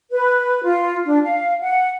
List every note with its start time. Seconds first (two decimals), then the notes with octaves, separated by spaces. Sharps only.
0.10 B4
0.63 F4
1.05 D4
1.22 F5
1.61 F#5